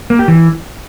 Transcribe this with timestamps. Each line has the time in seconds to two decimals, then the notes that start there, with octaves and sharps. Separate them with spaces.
0.10 A#3
0.19 G4
0.28 E3